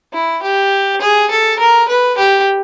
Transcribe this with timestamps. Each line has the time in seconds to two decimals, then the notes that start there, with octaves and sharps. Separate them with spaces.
0.13 E4
0.43 G4
1.01 G#4
1.30 A4
1.60 A#4
1.89 B4
2.18 G4